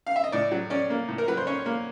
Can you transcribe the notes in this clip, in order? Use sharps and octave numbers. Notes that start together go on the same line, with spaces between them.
F5
E5
D#5
A2 D5
F#3
C#4 D5
A#3
A2
A#4
F#3 B4
C5
C#4 C#5
A#3